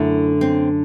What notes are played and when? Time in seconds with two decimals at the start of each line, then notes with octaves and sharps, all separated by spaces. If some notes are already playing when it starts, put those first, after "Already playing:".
Already playing: F#2 D3 A3 E4
0.41 C4